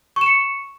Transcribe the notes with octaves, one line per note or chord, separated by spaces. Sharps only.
C#6 C#7 E7